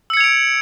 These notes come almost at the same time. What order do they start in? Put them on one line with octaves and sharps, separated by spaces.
E6 C#7 G#6 F7 D7